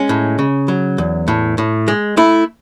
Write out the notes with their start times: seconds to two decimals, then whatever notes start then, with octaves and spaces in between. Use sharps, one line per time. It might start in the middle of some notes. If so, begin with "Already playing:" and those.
Already playing: G#3 C#4
0.09 A2
0.39 C#3
0.68 F#3
0.98 E2
1.28 A2
1.58 A2
1.88 G#3
2.17 A3 E4